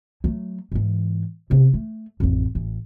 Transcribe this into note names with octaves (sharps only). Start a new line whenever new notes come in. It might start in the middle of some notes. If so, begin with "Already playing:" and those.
F#3 A3
G#2 E3
B1 C3
A3
A1 F2
A1